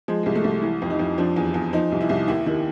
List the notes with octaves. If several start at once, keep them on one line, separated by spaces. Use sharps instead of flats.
F3 G#3
C2 G#3
A3
C2
E3
F2
D#4
F2
F3 D4
E2
E2
F3 D#4
C2
E4
C2
D#2 E4
D#3 E4